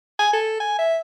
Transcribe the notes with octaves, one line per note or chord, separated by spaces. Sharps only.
G#5
A4
G#5
E5